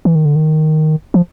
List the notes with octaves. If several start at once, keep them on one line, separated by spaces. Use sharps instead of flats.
E3
D#3
D3
D#3
F3